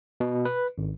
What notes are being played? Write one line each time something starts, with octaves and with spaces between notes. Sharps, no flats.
B2
B4
G#1